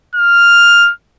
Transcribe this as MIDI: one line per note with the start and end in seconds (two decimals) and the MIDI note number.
0.16 0.91 89